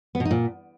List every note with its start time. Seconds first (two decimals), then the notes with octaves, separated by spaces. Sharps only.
0.15 B3
0.20 B2
0.25 D#4
0.31 A#2